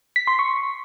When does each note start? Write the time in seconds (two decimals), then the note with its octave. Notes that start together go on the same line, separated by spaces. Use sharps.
0.16 B6
0.27 C6
0.39 C#6